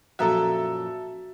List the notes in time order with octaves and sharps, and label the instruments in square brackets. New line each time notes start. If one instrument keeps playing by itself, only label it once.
[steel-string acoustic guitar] F#2 A#2 F3 [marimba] F#4 [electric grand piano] A4 E5 [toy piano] F5 A#5